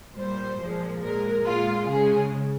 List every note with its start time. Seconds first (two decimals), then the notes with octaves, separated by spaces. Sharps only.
0.16 A#2 G3 C5
0.59 A#2 F3 G#3
1.01 A#2 G#3 A#4
1.45 A#2 G#3 F4
1.87 C#3 G#3 G#4